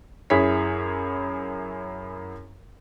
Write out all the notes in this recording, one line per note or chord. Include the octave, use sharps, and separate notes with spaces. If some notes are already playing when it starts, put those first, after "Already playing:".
F#2 E4 G#4 C#5 B6